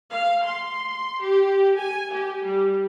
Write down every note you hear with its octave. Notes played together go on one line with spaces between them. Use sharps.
F5
C6
G4
G#5
G4
G3